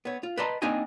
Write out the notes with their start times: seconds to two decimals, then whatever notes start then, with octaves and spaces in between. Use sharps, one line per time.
0.05 B3 C#5
0.23 F4
0.37 B4 D5 D#5 A5 A#5 C6
0.62 A#3 C4 D4 D#4 D#5 G#5